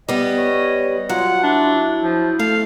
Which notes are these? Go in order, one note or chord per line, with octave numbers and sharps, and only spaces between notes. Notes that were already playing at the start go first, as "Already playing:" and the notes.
G3 B3 D#5
C#5
F#3 F4 F#5
D4 E4
F3
A3 A4 F5